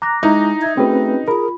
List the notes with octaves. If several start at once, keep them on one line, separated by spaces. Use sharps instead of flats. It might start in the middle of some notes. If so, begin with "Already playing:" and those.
A#5 D6 F#6 A#6
G#3 D#4 E4 A#5
E5 G#6
A3 C4 C#4 F#4 G#4 B4 G5
F4 G#4 A#4 B5